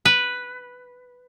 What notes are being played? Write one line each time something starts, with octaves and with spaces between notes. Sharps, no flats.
B4